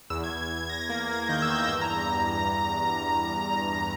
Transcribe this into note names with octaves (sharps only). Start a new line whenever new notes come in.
E2 E6
G#6
E2
E2 G#6
E2 A#6
A#3 G#6
A#3
D#3 G6
E6
E2
G6
G2 E6
A#5